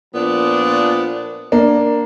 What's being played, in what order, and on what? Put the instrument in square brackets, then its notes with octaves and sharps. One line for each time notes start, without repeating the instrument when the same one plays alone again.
[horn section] A#2 F3 B3 D4
[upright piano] A#3 D4